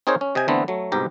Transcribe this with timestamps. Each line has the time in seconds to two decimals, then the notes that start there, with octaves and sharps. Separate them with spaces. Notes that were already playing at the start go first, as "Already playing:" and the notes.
0.07 C4 D#4 G#4 A#4 C5 C#5
0.21 C#4
0.35 C3 D#5 G5 G#5
0.48 D3 E3 A3 B3 C4
0.68 F#3 A3
0.92 C2 G#2 B2 G4 A#5